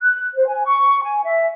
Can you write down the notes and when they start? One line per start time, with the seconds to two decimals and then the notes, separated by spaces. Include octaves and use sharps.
0.01 F#6
0.35 C5
0.48 G#5
0.65 C#6
1.03 G#5
1.24 E5